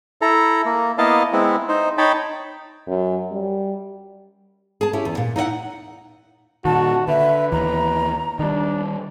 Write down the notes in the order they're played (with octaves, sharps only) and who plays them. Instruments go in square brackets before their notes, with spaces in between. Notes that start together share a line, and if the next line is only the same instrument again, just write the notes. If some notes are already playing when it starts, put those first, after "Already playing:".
[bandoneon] E4 A4 A#5
A#3
A#3 B3 E4 D#5 F5 A5
G#3 B3 C4 E4
D#4 C5
D#4 C#5 G5 A5 B5
[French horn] F#2
G3
[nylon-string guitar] G#4 A5
C#4 E4 G4
E2
A#2
D#4 E4 D#5 F#5
[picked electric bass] A#2 D#3 [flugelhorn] F#4 [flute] A5
[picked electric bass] D3 [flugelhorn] B4 [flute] E5
[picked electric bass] D#2 E3 [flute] A#5
[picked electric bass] D#3 G3 [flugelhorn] D4